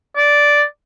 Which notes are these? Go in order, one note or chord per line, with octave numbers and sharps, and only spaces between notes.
D5